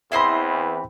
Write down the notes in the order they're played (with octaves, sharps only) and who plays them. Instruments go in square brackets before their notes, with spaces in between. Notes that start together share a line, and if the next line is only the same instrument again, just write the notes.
[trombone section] E2 E3 C4 [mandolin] E4 C5 D#5 [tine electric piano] E5 B5